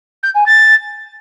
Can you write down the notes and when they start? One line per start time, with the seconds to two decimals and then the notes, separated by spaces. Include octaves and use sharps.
0.23 G6
0.35 G#5
0.46 A6